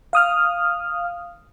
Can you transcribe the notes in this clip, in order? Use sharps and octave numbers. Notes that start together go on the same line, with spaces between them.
F5 D#6 F6